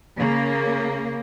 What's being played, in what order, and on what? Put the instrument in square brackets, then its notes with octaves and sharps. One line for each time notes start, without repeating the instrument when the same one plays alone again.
[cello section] C#3 A#3